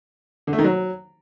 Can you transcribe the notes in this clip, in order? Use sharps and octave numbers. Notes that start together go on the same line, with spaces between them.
D3
A3
D#3
F#3